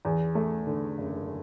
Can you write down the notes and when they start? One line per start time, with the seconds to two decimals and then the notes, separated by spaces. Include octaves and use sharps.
0.05 E2
0.35 A3
0.67 D3
0.98 F#1